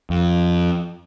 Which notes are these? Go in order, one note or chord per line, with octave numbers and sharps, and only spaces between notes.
F2